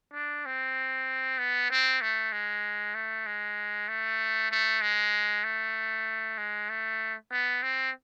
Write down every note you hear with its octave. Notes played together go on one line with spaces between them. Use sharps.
D4
C4
B3
C4
A3
G#3
A3
G#3
A3
A3
G#3
A3
G#3
A3
B3
C4